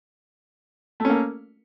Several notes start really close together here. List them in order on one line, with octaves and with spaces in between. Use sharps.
A3 C#4 A#3